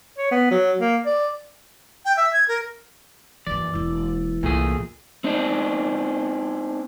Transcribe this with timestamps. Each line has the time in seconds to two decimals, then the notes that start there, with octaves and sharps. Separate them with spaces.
0.17 C#5
0.31 B3
0.51 F#3
0.80 A#3
1.06 D5
2.05 G5
2.17 E5
2.33 G#6
2.48 A#4
3.47 A#1 F#2 E3 D5
3.74 E1 A#2 E4
4.43 C2 A#2 F#3 A3 G#4
5.24 C4 D4 D#4